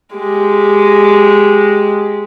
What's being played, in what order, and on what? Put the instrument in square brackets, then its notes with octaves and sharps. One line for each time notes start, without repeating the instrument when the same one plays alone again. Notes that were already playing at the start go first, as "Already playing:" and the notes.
[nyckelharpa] G#3 G4